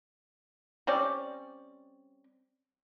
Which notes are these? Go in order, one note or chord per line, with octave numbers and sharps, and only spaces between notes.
G3 C4 C#4 D5